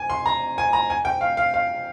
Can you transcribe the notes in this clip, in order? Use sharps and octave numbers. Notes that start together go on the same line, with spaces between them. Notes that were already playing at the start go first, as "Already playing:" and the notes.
Already playing: G#5
C6
A#5
G#5
A#5
G#5
G5
F5
F5
F5